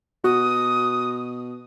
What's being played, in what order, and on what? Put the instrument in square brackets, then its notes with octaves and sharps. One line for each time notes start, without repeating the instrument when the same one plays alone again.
[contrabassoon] B2 [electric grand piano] F#4 [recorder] D#6